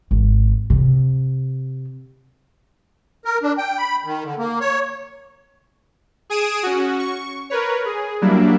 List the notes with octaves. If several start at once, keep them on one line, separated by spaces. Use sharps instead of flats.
G#1
C3
A#4
D4
G5
B5
D#3
D3
A#3
C#5
G#4 G#5 D#6 D7 E7
C#4 F#4
C#6
A#4 B4 C#5
G#4
F#3 G3 A#3 D4 E4